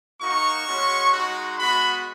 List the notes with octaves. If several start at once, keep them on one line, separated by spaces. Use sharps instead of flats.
A#3 D#4 F#4 C#6
G#3 C#4 F#4
G#3 D#4 F#4
G#3 B3 F#4 B5